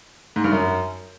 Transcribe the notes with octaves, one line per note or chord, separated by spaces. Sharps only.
G#2
G2
F#2